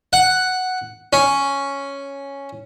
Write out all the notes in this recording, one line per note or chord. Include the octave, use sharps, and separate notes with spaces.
F#5
C#4